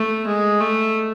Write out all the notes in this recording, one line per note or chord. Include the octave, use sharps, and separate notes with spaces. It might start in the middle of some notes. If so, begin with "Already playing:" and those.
Already playing: A3
G#3
A3